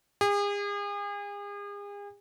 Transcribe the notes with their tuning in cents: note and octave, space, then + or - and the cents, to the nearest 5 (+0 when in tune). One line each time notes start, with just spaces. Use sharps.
G#4 -40